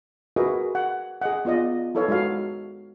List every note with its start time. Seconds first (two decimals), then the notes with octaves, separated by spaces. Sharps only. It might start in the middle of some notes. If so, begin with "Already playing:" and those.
0.36 F#4 G#4 A#4 B4 D#5 E5
0.75 F#5
1.22 G#4 D#5 F#5
1.45 B3 F4 D5 D#5
1.95 D#4 E4 A4 B4 C#5 F5
2.09 G#3 D#4 F#4 F5